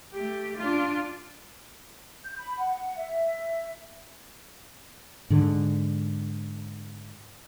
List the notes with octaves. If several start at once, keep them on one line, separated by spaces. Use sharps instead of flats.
A3 G4
D4 F4
G6
B5
F#5
E5
G#2 D3